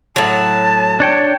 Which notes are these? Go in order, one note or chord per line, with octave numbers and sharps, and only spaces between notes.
A2 F#3 A5
D4 C#5 G5